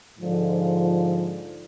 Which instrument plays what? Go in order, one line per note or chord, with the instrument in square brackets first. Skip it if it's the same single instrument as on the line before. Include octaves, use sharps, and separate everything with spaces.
[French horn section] G#2 D3 F3